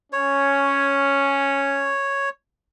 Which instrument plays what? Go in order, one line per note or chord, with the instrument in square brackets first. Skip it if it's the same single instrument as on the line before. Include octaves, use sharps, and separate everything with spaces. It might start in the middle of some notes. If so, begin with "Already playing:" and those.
[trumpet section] C#4 [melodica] C#5